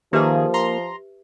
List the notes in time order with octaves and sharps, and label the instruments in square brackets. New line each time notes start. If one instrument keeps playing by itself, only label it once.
[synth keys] D#3 G#4 [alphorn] F3 [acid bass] A#3 [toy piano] G4 B4 E5
[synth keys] A#5 C6